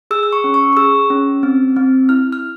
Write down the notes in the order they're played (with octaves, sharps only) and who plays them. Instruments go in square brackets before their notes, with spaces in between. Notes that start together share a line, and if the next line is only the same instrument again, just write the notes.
[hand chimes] G#4 E6
E6
C#6
C#4
C#6
C#6
G#4 E6
C#4
C4
C4
E4 F6
F6